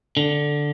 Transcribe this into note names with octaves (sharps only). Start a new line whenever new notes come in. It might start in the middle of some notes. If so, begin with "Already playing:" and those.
D3